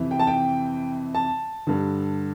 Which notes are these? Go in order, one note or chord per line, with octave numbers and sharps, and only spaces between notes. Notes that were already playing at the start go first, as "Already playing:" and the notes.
Already playing: F2 C3 E3
G5
A5
G5
A5
G2 D3